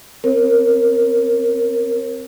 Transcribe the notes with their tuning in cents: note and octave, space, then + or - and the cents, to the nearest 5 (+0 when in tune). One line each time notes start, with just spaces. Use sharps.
C4 +0 A#4 +0 C#5 -45